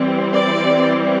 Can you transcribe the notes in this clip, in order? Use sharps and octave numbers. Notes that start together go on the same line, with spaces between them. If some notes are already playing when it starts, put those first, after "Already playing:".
Already playing: E3 G3 C4
D5